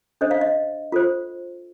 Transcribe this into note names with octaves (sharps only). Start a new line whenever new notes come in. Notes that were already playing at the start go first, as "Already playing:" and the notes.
D4 A4 C5 D#5
F5
D#5
F4 A4 C5